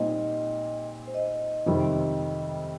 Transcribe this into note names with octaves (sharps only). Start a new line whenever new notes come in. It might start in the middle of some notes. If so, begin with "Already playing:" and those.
Already playing: A#2 G3 C4 D#4 D#5
C5
D#5
F2 C3 D#3 G3 C4